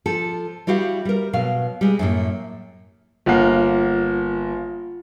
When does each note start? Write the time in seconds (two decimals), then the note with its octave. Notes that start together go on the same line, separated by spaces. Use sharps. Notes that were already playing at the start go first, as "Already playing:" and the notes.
0.06 F3 A4
0.67 G3 E4 F#4 G4 F5
1.05 G3 A#4
1.33 B2 F#3 F5
1.81 G3 G#3
1.99 F#2 A2 A#3
3.26 G1 A#3 F4 F5 F#5